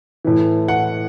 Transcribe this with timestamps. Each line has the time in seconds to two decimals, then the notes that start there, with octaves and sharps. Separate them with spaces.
0.25 A2 E3
0.68 F#5